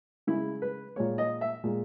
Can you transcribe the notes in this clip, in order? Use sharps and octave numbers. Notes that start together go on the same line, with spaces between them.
C#3 G#3 E4
B4
A#2 G#3 C#5
D#5
E5
A#2 G#3